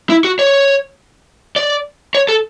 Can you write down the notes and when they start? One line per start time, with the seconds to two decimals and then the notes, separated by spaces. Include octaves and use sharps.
0.10 E4
0.24 F#4
0.39 C#5
1.56 D5
2.15 C#5
2.29 A4